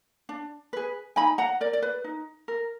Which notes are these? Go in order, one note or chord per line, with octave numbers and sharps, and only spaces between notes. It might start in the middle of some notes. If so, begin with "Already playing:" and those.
D4
G#4 B4
D#4 G#5 B5
F#5 A#5
A#4 D5
D5
B4
D#4
A#4